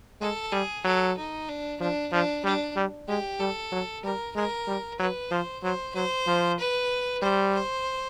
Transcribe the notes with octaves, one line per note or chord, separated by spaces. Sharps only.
G#3 A4
G3 G#4
F#3 A4
D#4
D4
F3 D4
F3 D4
G3 D4
G3
G#3 G4
G3 A4
F#3
G3 A#4
G#3 A#4
G3
F#3 B4
F3 C5
F#3 C5
F#3 C5
F3
B4
G3 C5
C5